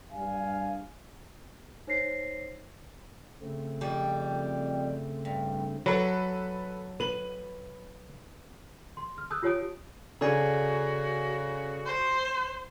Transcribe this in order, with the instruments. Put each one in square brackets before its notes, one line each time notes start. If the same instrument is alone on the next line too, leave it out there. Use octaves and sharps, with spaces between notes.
[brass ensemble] G2 F5 G#5
[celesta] D#4 C5 C#5 A#6 C7
[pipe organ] C#3 A3 C4
[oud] F2 G3
G2
[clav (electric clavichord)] F#3 [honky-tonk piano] A4 B4
[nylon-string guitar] B4 [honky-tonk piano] D#7 F#7
[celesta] C6
F6
A5 D#6 E6 F#6 G6
F4 G4 C#5 A5 D#6 D7
[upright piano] C#3 [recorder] F#4 [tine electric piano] A4 D5 G#5
[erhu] C5